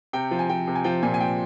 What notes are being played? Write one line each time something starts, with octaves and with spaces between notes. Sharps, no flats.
C3 G5
F3
G#5
F3 G5
C3
G#5
F3 G5
A#2 G#5
G#5
F3 G5